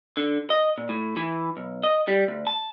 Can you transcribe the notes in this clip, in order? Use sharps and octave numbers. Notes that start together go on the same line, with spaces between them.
D3
D#5
A#2
A2
E3
B1
D#5
G3
D2
A5